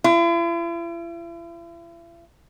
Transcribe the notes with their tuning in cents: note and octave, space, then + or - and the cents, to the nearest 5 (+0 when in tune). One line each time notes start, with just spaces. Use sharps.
E4 +45